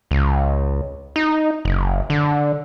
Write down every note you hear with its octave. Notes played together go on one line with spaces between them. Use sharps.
C#2
D#4
F#1
D3